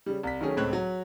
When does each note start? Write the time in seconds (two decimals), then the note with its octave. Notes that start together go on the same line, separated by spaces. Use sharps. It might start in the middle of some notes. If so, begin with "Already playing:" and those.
0.06 C#3 G3
0.23 C2 B6
0.41 D#3 F#3 A3 C#4 G#4
0.57 C#2 A2 C4 C#5 F#6
0.73 F#3